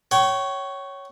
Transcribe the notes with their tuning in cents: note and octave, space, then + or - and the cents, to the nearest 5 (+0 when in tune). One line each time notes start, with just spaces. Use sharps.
C#5 +0 G5 -40